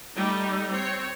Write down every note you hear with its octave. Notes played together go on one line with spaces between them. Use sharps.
G3 A3 D#4
C4 C#5